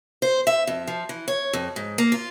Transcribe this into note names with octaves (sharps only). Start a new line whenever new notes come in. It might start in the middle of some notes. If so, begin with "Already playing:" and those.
C5
E5
F2
F3
E3
C#5
F2
G#2
A#3
F4